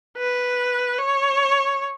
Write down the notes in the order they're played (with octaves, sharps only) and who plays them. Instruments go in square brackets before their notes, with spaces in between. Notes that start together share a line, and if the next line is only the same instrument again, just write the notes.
[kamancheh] B4
C#5